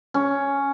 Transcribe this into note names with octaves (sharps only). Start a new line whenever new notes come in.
C#4